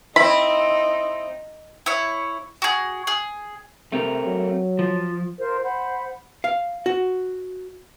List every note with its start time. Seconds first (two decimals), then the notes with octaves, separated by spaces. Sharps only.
0.16 C4 D#4 E4 B5
1.86 E4 C#5
2.62 F#4 G#4
3.07 G#4
3.92 C3 A3 C4 A#4
4.26 F#3
4.79 F3
5.37 F4 A#4 C5
5.64 C5 F#5 B5
6.44 F5
6.86 F#4